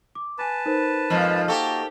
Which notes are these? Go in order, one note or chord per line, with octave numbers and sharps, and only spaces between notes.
D6
B4 G#5 A5 B5
D#4 A#4 C5
F2 G#2 F3
A#3 F#4 G4 A4 D#5